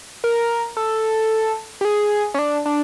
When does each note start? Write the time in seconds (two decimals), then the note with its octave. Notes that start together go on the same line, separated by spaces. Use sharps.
0.24 A#4
0.77 A4
1.81 G4
1.85 G#4
2.34 C#4
2.39 D4
2.66 D4